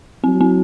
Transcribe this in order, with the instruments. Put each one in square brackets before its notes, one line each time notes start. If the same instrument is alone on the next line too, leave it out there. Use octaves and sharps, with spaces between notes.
[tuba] F#3 [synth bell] C4
[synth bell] C4